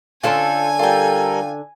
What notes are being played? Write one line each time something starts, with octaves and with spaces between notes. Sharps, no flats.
D3 C#4 D4 F4 A4 C5 G#5
G3 F4 A4 A#4 G5